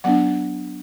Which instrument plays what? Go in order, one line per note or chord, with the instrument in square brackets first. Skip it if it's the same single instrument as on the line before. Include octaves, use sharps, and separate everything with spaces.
[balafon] F#3 B3 D4 F#5